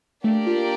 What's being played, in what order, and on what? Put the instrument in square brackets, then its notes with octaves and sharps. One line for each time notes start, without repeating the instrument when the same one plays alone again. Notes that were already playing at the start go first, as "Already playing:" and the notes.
[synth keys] A3 [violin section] A#3 D4 G4 A#4 D5
[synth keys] F4